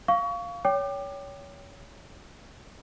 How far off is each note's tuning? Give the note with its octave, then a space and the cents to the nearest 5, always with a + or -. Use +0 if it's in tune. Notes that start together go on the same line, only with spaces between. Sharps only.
F5 +0 C#6 +25
C#5 +25 G5 +0 D6 +30